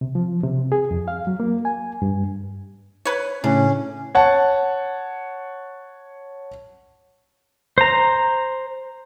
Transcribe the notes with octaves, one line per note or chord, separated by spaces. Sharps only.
C3
F3
C3
G#4
F2
F5
F#3
A#3
G#5
G2
B4 C#5
A2 C#3 C#4 D4
C#5 F#5 A5
C5 A#5